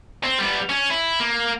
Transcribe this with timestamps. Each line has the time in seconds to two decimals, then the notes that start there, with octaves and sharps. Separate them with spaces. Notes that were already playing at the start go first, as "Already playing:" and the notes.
0.24 C4
0.39 G3 B3
0.69 C#4
0.90 E4
1.20 A#3